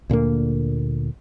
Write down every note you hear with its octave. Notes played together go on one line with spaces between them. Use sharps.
D2 A#2 D3 A#3